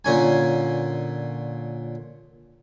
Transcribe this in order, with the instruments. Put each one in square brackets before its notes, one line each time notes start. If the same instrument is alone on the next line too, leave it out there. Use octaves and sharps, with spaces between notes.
[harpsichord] A#2 D3 C#4 G#5